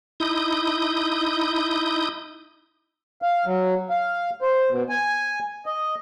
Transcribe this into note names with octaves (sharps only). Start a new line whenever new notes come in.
D#4 E4 D#6 G6
F5
F#3
F5
C5
B2
G#5
D#5